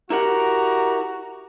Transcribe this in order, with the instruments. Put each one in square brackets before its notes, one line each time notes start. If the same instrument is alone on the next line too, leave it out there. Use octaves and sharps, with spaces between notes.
[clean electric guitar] E4 A#4 F#5 [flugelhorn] F#4 [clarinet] G4 [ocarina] A#5